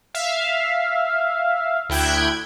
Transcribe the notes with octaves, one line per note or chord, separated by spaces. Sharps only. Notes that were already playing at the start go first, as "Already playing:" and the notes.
E5 F5
D2 E4 G5 F#6 G#6